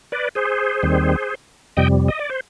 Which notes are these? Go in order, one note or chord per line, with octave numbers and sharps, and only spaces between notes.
B4 D5
G#4 C5
D#2 D#3 G3 C4
F2 C3 G3 D#5 G5
D#5
D5
C5